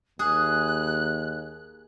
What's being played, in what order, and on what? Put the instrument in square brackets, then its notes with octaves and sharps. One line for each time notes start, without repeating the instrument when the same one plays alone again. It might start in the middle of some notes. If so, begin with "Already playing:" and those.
[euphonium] D#2 [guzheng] G#4 [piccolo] F#6